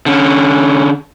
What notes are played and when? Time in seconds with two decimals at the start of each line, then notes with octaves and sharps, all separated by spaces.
0.06 D3 C#4